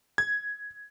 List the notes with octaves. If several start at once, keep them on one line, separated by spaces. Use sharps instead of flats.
G#6